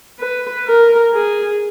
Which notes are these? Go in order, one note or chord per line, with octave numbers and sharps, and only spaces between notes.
B4
A#4
G#4